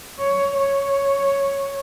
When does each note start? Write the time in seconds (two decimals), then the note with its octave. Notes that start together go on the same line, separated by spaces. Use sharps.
0.19 C#5
0.57 C#5